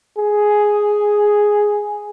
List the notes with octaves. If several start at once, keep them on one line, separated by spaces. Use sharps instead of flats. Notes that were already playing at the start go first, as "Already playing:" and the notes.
G#4